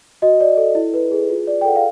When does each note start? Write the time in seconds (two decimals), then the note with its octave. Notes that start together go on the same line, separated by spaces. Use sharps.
0.22 F#4 D#5
0.41 D5
0.57 A4
0.75 E4
0.94 B4
1.11 G#4
1.29 F4
1.47 D5
1.61 G5
1.65 A4 F#5
1.76 F5